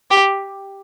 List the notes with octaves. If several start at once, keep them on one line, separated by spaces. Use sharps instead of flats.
G4